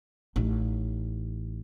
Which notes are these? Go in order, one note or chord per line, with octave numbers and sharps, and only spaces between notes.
A1 D#4